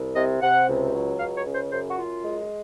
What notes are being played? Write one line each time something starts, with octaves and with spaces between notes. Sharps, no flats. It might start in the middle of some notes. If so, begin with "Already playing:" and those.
Already playing: C2
C3 D#5
C3 F#5
C#2
F#3
C#2 F5
C#5
C#3
C5
F#2 C5
F#4
F#2 F4
G#3